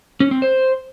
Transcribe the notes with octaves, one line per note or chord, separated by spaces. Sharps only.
C#4
C4
C5